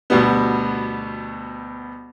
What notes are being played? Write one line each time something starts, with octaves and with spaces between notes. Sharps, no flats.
D2 B2 G3 B3